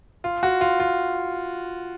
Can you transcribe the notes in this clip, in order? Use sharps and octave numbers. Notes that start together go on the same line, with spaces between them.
F4
F#4
F4
F4